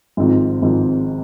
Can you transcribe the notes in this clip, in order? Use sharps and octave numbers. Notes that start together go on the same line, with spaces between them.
G#1 G#2 F3 C4
G#1 G#2 F3 C4